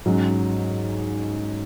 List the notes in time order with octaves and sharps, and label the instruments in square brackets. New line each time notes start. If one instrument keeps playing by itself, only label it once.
[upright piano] G#2 F#3 C#4